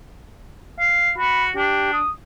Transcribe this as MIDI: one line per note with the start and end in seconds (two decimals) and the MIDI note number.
0.79 1.11 77
1.18 1.51 66
1.18 1.46 83
1.56 2.01 62
1.56 1.89 67
1.93 2.13 87